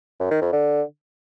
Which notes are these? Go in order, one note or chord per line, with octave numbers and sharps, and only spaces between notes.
F#2
D#3
F2
D3